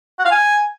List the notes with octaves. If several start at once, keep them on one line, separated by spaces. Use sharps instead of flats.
F#5
F5
G#5